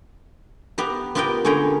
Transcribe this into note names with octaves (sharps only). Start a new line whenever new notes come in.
B3 G4 A#5
B3 F4 G4 A#4 D#5 G5
D3 C#4 G#4 A#4 G5 A#5